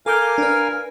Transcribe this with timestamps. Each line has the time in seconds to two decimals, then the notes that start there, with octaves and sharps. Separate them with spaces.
0.06 A4 A#4 F5 G#5 D6 G6
0.38 D4 B4